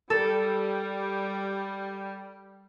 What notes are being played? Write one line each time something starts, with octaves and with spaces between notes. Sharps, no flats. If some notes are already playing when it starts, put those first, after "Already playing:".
G3 A4